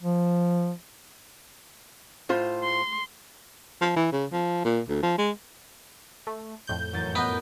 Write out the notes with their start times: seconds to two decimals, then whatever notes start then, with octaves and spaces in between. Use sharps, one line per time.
0.01 F3
2.29 A2 F4 C5
2.64 C6
3.81 F3
3.96 E3
4.12 C#3
4.32 F3
4.65 A#2
4.89 D2
5.03 F3
5.18 G#3
6.27 A3
6.67 F2 A2 G6
6.93 A1 F#2 A6
7.15 B3 A#4 D#5 F#6